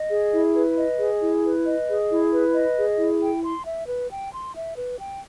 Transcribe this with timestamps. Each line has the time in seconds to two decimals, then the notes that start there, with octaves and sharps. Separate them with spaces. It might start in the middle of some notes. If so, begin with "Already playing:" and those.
Already playing: D#5
0.10 G#4
0.32 E4
0.55 B4
0.77 D#5
0.99 G#4
1.21 E4
1.44 B4
1.66 D#5
1.88 G#4
2.10 E4
2.32 B4
2.54 D#5
2.77 G#4
2.99 E4
3.21 G5
3.43 C6
3.65 E5
3.88 B4
4.11 G5
4.33 C6
4.55 E5
4.77 B4
4.99 G5